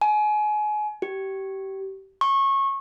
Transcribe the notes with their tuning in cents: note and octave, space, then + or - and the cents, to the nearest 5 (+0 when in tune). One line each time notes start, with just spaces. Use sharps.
G#5 +30
G4 -25
C#6 -25